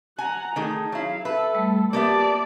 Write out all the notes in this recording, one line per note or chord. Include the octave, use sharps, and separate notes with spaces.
F#5 G#5 A#5
D#3 A3 D#4 G#4
F#3 E4 F5
A4 B4 E5
G3 A3
A#3 B3 G4 D5 E5 A5